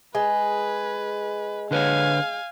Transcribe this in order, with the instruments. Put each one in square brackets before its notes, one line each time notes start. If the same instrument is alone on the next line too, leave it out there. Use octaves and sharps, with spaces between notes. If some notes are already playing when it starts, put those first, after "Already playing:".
[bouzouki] G#3 [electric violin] B4
[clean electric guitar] D3 B4 C#5 [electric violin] F5 G#5